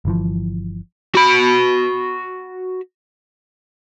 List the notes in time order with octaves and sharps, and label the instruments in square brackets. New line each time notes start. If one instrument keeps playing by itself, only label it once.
[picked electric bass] G1 E3 F3
[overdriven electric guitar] F#4 B5